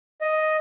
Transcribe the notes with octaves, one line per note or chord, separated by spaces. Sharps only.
D#5